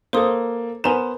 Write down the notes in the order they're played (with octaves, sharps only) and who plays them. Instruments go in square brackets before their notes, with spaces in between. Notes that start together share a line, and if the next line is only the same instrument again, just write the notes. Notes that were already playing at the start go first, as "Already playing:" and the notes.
[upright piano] A#3 A4 [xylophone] C5 C6 D#6
[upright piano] B3 C5 E7 [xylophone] A#4 G#5 A#5